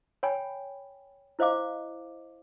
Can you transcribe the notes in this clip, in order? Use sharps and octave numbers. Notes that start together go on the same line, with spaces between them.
C#5 G5 G#5 B5
E4 C5 D#5 F5 D6